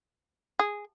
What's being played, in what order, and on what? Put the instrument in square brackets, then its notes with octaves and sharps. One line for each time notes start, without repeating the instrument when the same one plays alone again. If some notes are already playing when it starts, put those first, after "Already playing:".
[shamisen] G#4